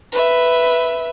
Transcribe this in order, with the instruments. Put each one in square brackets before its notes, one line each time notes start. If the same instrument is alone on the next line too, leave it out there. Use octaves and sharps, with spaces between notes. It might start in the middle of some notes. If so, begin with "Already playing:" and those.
[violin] B4 E5